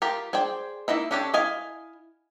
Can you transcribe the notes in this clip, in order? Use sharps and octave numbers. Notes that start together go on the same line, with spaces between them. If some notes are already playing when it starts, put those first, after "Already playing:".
F4 G4 A#4
G#4 C5 D5 G5
A#3 D#4 E4 E5
C#4 D4 G4 A4 C#5
E4 D#5 F5 G#5